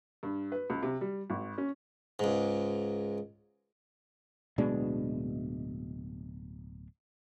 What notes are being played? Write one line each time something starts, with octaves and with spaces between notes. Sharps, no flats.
G2
B4
C#2
C3
G3
G#1
C#4
C#2 G#2
D1 B2 G#3 D4